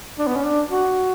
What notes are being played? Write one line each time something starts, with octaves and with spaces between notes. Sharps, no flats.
D4
B3
C#4
D4
F#4